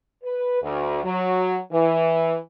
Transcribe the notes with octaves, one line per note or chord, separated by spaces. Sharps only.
B4
D2
F#3
E3